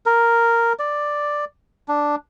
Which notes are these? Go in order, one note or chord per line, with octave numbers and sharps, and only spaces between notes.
A#4
D5
D4